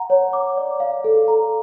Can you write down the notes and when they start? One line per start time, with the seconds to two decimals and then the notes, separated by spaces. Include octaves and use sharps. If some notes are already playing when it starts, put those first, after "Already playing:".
Already playing: F#5 A#5
0.10 C#5
0.33 D6
0.57 D5
0.80 F5
1.04 A4
1.28 A#5